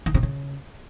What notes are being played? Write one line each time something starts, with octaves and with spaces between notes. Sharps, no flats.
D#3
C3
C#3